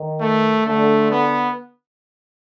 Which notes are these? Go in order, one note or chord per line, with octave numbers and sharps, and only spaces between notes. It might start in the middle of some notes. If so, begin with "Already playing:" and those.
Already playing: D#3
A3
D3 A3
B3